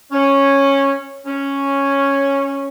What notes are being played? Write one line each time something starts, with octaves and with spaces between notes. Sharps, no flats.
C#4
C#4